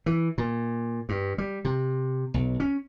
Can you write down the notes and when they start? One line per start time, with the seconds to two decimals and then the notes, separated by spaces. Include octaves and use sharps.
0.06 E3
0.38 A#2
1.09 G2
1.38 G3
1.65 C3
2.34 B1
2.60 C#4